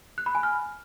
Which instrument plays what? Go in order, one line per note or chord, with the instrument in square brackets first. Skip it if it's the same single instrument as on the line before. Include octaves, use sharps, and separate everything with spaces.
[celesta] F#6
B5
G#5
F6